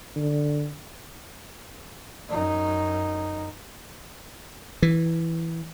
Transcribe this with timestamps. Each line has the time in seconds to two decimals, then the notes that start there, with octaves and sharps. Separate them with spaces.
0.16 D3
2.29 F#2 D#4
4.82 E3